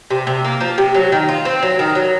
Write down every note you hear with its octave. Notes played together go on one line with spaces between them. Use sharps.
C3
C3
A#3
F3
C3
F#3
D#3
F4
C4
F#3
D#3
F#3